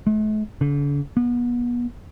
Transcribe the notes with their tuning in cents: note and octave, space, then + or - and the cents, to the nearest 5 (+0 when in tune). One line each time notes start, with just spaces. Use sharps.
A3 -45
D3 -40
B3 -35